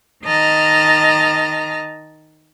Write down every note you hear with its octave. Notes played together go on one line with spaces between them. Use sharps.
D#3 D#5 A5 A#5 F6